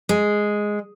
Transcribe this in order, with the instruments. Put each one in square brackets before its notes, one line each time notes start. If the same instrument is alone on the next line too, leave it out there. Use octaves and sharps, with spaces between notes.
[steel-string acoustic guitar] G#3